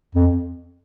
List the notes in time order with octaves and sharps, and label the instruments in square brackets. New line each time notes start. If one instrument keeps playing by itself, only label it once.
[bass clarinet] F2